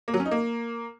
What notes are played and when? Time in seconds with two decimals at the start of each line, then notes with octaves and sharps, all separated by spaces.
0.08 A#3
0.14 F#3
0.20 C#4
0.25 D#4
0.31 A#3